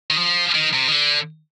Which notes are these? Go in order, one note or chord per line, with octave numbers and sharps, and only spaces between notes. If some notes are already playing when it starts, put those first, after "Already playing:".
D#3
F3
D#3
C3
D#3
D3